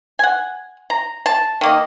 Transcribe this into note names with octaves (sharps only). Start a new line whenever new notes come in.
F#5 G#5
A#5
A5
D#3 A#3 D#5